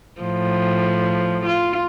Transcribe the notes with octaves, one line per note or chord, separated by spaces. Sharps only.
A2 F3
F4